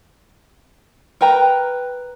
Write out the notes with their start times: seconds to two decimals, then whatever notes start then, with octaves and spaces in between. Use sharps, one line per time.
1.21 A#4 B4 G5 A#5